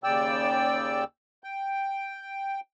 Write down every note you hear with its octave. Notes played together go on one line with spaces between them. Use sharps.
D#2 C#3 D5 G5 E6
G5